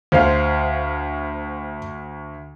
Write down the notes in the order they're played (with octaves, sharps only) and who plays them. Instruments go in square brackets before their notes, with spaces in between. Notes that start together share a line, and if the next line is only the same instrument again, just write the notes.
[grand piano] D2 F5 [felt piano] C5